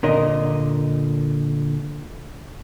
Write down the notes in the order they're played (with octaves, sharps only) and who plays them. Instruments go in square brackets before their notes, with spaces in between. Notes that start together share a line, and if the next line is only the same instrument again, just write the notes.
[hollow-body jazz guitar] A#2 D3 A#4 D#5